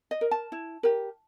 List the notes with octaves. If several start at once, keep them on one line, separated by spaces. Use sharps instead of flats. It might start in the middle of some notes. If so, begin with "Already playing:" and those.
D#5
A#4
A5
E4
G4 A#4